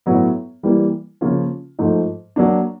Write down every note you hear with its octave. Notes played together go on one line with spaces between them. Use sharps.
A2 F#3 B3
E3 G3 A#3
C#3 F3 A#3 C#4 F4
G#2 F3 A3
F#3 A#3 D4